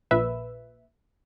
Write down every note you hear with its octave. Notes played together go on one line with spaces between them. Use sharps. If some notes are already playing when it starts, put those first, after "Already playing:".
A#1 A#2 B4 E5